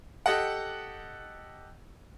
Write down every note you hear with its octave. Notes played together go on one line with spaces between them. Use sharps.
G4 A4 D#5 F#5